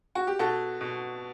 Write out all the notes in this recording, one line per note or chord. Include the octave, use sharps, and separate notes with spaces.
F#4
G4
B2 F#4 A4
B2